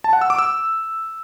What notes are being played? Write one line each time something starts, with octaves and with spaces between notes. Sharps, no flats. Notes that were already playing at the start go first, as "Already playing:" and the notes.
A5
F#5
E6
D6
E6